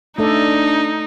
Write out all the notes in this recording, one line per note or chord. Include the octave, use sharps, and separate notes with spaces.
A3 D4 D#4 A4 D5